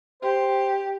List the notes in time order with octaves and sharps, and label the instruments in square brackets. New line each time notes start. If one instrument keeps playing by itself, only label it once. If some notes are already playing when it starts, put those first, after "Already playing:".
[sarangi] G4 [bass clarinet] C5